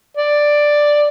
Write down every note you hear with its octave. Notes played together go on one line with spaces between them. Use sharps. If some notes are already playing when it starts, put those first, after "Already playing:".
D5